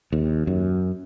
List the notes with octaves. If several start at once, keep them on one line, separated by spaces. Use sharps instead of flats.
D#2
F#2